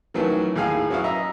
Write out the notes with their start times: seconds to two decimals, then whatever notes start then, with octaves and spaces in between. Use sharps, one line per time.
0.14 D#3 E3 F#3 A3 C#4
0.56 D#2 A2 G#4 F5 G#5
0.90 F#3 C#4 E4 F#4 F5 D#6
1.04 D#5 E5 A#5